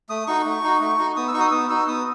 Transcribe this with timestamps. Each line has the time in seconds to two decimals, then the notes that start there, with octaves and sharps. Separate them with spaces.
0.09 A3 D#6
0.27 D#4 F#4 C#6
0.45 A3
0.63 D#4 F#4
0.81 A3
0.98 D#4 F#4
1.16 B3 D#6
1.28 E6
1.33 D#4 C#6
1.37 F#4 D#6
1.48 E6
1.51 B3 D#6
1.70 D#4 F#4 E6
1.87 B3 D#6